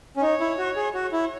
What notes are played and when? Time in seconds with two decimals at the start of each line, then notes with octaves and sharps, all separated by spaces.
0.17 C#4
0.22 D#4 C#5
0.40 E4
0.58 F#4
0.76 G#4
0.94 F#4 C#5
1.12 E4